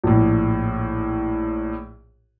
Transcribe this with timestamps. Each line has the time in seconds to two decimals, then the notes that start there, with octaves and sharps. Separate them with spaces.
0.04 A#1 A2